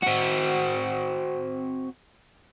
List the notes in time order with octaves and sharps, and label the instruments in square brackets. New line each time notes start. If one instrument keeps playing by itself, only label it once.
[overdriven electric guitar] C4 F#4